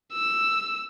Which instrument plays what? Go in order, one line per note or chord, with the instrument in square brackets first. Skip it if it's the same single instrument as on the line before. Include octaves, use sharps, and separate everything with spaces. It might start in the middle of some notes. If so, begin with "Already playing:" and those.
[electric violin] E6